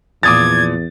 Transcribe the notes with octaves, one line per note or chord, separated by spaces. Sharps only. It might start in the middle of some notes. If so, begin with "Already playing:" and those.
E2 A#2 F3 D6 D#6 G#6 A6